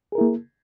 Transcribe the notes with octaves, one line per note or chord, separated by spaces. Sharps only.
A#3 E4 G#4 A#4